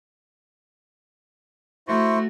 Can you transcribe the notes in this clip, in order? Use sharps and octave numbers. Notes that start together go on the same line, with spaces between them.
A3 E4 F#4 C5 C#6